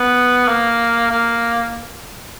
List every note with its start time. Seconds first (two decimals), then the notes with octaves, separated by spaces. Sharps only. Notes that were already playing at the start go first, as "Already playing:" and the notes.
Already playing: B3
0.48 A#3
1.11 A#3